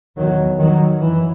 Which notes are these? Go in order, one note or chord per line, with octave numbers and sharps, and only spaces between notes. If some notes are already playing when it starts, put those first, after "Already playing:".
E2 B2 D#3 F#3
D#3 F#3
F#2 E3